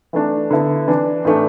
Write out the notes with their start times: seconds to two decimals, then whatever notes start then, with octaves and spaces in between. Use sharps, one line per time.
0.13 E3 A3 D4
0.51 D3 B3 E4
0.88 E3 D4
1.25 A2 E3 A3 D4